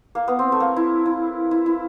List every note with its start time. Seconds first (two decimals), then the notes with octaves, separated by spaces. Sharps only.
0.15 A#3
0.28 B3
0.39 C4
0.52 A3
0.60 A#3
0.76 E4
1.06 E4
1.51 E4
1.66 E4